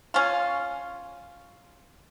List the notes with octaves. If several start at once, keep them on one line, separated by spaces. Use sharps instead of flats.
C#4 F4